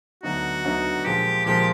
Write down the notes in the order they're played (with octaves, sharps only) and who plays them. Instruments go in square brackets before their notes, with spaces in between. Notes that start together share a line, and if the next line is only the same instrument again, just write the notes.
[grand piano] D2 D3 F#3 B3 D#4 [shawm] F#4
[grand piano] D2 D3 F#3 B3 D#4
[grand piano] A#2 F3 G#3 [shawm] G4
[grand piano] A#2 F3 G#3 [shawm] G4